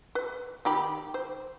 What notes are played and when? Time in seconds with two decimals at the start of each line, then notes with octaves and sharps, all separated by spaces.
0.15 B4
0.65 D#3 G4 B5
1.14 C5